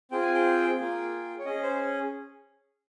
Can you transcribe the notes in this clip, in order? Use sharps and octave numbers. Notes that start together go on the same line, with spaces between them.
C4 F4 G#4 G5
G#5
G5
A#3 F4 G#4
C#5
C#4 G#4 D#5
C5